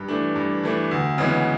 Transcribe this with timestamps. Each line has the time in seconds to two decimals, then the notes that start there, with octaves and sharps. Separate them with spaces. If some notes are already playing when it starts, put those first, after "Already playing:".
Already playing: G2
0.08 E3 A3 D4
0.36 G2
0.64 E3 A3 D4
0.91 D2
1.18 C#3 E3 G#3 B3